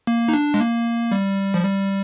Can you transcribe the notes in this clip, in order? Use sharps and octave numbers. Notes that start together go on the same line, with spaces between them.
A#3
D#4
D4
G#3
A#3
G3
F3
G3